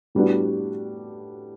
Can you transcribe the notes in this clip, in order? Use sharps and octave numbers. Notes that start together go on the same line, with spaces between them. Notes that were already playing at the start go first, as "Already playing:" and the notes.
A2 G3 B3 D4 F#4